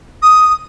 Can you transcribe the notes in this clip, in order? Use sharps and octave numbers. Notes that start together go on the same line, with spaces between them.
D#6